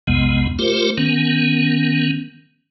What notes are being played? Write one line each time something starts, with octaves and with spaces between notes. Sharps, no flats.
B1 F2 C3 G#3 B3
A3 F4 G4 A#4 C5
D#3 B3 C#4